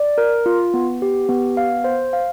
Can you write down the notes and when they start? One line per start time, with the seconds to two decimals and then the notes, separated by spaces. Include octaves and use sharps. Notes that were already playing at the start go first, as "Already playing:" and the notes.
Already playing: D5
0.18 A#4
0.46 F4
0.74 B3
1.02 G4
1.29 B3
1.57 F5
1.84 C5
2.13 F5